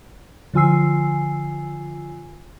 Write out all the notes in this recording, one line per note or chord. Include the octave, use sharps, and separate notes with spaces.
D3 F3 F4 G#5 E6 C7